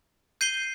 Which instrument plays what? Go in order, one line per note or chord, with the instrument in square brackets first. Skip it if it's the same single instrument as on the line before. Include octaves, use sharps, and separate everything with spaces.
[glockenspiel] G6 C7 D#7 G7